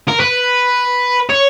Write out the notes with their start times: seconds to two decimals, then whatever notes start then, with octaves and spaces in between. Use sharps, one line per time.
0.08 A#4
0.20 B4
1.30 C#5